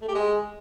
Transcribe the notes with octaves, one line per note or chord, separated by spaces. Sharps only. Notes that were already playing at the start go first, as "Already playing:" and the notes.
A3
G4
G#3